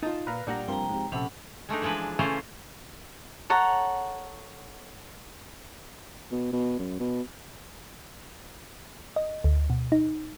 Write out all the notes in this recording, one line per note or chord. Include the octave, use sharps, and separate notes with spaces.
D#4 F4 A5
A#2 B4 F5 A#5
A#2 G3 D4 F#5 A#5
G2 C3 F3 A#3 G5 A#5 C6
G#2 C3
A#1 C3 C#4 A4 F#5 B5
G#3 A3 D4 D#4
E3 F3 G#3 D4 B4
C#3 E3 A3 C#4 F4 C5
A4 C#5 F#5 A#5
B2
B2
F#2
B2
D#5
D2
B2
D#4